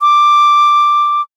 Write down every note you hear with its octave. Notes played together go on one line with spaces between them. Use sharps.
D6